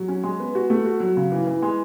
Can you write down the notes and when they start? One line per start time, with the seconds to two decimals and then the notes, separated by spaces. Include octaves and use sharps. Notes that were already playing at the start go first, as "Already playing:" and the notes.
Already playing: F#3
0.08 C#4
0.23 G#3
0.40 B3
0.55 F#4
0.70 A3
0.85 F#4
1.00 F#3
1.17 C#3
1.32 E3
1.47 E3
1.62 G#3